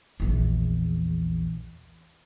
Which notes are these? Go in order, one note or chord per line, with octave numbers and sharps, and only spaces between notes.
A#1 E2